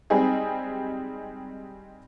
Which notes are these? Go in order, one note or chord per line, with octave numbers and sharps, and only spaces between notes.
G3 G#3 C4 D#4 G#4